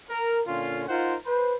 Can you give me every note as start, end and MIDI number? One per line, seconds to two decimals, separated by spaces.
0.10 0.41 70
0.47 0.84 46
0.47 0.84 50
0.47 0.84 61
0.47 0.84 65
0.88 1.15 63
0.88 1.15 65
0.88 1.15 70
0.88 1.15 72
0.88 1.15 78
1.25 1.56 71
1.25 1.56 72